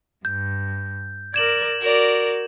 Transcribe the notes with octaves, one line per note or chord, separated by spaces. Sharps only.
G2 G6
A#4 D5 G#6 E7 F#7
F#4 A#4 D5